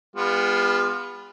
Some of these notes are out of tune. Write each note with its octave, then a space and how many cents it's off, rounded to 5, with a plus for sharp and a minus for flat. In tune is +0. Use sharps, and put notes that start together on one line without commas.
G#3 -45 B3 +0 F4 +0